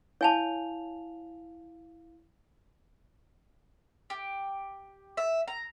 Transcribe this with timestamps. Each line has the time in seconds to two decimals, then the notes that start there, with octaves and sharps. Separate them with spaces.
0.21 E4 C#5 F5 G#5 A5 F7
4.10 G4
5.17 E5
5.48 A#5